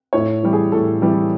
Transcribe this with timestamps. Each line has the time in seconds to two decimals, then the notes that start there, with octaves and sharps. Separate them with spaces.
0.13 A2 C#5
0.43 E3 G3
0.53 G#4
0.72 A2 A4
1.02 E3 G3